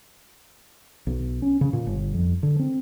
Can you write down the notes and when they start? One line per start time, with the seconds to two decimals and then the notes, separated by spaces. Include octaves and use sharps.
1.07 B1
1.42 C#4
1.61 C#3
1.73 A#2
1.87 G1
2.14 F2
2.43 D3
2.59 C4